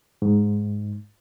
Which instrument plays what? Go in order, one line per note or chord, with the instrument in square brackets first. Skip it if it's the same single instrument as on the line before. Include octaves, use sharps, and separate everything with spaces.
[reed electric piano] G#2